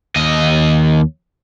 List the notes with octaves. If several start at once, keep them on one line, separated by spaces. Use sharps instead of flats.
D#2 D#5